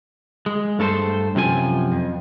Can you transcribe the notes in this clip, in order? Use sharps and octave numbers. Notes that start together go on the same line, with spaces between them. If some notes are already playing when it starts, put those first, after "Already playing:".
G#3
G2 A3 A4 A#4 C5
F#2 C3 F3 G#4 G#5
F2